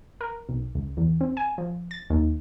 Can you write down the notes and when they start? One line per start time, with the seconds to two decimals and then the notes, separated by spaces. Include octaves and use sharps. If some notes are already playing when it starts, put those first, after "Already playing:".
0.21 A#4
0.49 B1
0.75 C#2
0.97 E2
1.21 C4
1.37 G#5
1.58 F3
1.91 A6
2.10 D#2